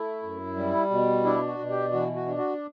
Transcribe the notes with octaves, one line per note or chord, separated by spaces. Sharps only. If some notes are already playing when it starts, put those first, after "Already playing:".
Already playing: A3 E4
F#2
G3
B2
D4 E4
F#4
B2
G4
E3 F#4
F#4
D4
F#4